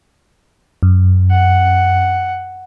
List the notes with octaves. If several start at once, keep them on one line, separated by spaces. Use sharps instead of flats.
F#2
F#5